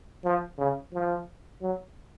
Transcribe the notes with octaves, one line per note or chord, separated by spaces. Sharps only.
F3
C#3
F3
F#3